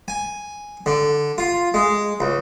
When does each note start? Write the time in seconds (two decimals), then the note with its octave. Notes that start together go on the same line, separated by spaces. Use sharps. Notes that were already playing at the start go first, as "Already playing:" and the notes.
0.08 G#5
0.86 D3
1.38 F4
1.74 G#3
2.20 C#2